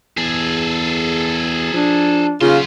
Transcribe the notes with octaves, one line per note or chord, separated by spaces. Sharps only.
E2 G#4 A4
F3 D4
D#2 C#3 F#3 F4 C6